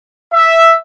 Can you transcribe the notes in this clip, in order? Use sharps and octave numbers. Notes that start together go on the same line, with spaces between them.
E5